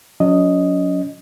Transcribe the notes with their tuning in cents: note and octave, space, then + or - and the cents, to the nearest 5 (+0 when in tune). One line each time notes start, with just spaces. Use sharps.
F#3 -35 C#4 +35 D#5 +0